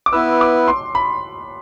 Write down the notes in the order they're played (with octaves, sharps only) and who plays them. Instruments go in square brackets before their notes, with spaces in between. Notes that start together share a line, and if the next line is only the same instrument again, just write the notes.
[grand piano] D6
[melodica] B3 E4 B4 [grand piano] E6
[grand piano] D6
C6
B5